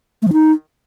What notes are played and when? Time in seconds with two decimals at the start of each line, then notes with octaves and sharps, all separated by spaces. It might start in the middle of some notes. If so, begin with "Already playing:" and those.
0.22 A3
0.28 F3
0.33 D#4